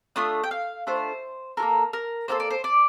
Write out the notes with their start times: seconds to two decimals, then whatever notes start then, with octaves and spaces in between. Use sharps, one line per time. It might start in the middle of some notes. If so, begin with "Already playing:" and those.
0.16 A3 D4 F4 D#6
0.44 G5
0.51 F5
0.87 A3 D4 F4 C5
1.57 F4 A4 A#4
1.62 A#3
1.93 A#4
2.28 A#3 F4 A4 C5
2.40 D5
2.50 C5
2.64 D5